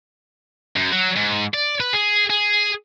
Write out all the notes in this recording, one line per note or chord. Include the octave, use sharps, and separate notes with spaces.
F#2
F#3
G#2
D5
B4
G#4
G#4